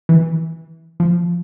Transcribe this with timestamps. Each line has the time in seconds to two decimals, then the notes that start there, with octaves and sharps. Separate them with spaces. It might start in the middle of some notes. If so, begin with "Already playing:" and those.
0.09 E3
1.00 F3